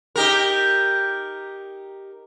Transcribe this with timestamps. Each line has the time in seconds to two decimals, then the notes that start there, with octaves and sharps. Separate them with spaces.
0.16 D#4 G4 A#4